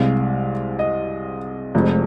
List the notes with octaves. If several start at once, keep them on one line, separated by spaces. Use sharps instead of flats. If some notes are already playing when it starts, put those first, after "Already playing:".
Already playing: C2 C3 G#3 F5
D#5
F1 F2 F3 G#3